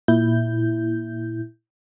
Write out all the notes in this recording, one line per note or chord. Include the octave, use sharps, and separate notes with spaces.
A#2 E4 G6